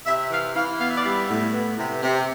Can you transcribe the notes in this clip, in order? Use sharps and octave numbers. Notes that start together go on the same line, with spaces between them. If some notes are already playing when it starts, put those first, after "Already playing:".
C3 E5
E3 F5
E3 F5
B3 F5
E5
D5
G3 E5
A2
B3
C3
C3